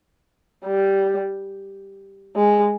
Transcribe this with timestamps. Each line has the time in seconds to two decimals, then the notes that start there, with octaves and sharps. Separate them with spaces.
0.65 G3
2.36 G#3